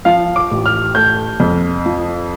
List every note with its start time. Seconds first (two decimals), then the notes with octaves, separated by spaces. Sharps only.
0.05 F3 F5
0.36 D6
0.51 A1
0.66 F6
0.95 A3 G6
1.40 F2
1.86 F3